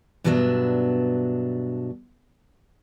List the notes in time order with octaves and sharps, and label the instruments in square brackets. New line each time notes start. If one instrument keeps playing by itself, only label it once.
[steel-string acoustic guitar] G2 B2 F#3 B3 D4 E5